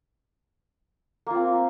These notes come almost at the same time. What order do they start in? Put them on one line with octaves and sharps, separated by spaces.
A#3 F4 C4